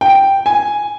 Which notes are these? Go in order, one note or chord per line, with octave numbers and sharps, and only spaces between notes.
G5
G#5